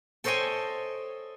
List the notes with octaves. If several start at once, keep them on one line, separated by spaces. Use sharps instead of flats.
A4 C5 C#5 D#5 G5 G#5